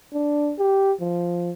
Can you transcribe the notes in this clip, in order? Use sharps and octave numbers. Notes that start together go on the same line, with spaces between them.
D4
G4
F3